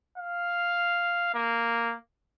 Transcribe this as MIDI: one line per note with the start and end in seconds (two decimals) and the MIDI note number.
0.18 1.32 77
1.34 1.95 58